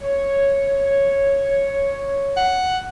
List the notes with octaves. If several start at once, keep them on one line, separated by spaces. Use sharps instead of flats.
C#5
F#5